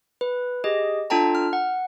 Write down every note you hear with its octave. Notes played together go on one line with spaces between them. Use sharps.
B4
G4 G#4 D#5
D4 F4 A4 G5 A5 A#5
F6
F#5